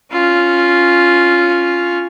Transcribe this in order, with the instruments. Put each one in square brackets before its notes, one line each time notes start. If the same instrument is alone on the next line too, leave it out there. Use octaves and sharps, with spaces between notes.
[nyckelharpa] C#4 F4